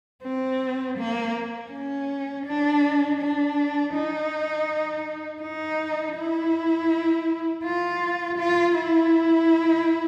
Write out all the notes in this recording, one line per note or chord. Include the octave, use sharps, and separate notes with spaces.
C4
A#3
C#4
D4
D4
D#4
D#4
E4
F4
F4
E4